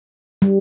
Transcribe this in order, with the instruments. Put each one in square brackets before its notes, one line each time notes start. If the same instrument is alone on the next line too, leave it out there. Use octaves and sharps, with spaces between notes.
[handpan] G3